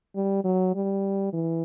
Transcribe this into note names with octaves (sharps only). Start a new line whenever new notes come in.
G3
F#3
G3
E3